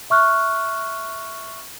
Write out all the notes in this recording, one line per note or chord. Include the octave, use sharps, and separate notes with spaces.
E5 C#6 F6 F#6